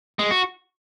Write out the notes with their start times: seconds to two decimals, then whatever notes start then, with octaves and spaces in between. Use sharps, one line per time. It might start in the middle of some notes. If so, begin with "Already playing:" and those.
0.19 G#3
0.31 F#4